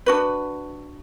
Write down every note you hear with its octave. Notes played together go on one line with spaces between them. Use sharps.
D4 F#4 B4